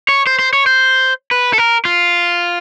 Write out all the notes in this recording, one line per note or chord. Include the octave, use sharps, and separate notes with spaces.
C#5
C5
C5
C#5
C5
B4
A4
A#4
F4